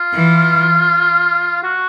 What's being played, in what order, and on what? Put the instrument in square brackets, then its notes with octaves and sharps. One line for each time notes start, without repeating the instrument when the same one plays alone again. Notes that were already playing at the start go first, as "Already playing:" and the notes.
Already playing: [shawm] F4
[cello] E3
[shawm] F#4